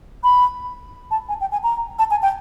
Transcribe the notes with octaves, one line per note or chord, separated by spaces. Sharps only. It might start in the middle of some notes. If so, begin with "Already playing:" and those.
B5
A5
G#5
G5
G#5
A#5
A5
G#5
G5